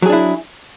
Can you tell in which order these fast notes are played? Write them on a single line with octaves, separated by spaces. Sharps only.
F#3 G#4 D4 E4